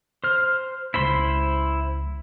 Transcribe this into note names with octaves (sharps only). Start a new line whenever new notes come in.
C5 F6
C#2 E4 C5 B5 C6 B6